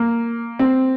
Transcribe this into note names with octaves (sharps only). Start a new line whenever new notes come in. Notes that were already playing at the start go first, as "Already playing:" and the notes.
Already playing: A#3
C4